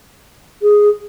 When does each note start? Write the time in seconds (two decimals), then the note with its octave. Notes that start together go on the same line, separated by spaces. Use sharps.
0.62 G#4